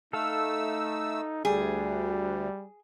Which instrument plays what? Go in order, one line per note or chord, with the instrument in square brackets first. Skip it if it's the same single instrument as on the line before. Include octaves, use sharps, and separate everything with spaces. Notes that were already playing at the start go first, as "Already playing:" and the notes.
[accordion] A3 E6 [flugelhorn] D#4 [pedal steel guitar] A4 F5
[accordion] D2 [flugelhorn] G3 [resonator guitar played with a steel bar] G#4